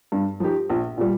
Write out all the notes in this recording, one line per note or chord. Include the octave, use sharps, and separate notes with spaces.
G2
F3 D#4 G4
A#1
A#2 G3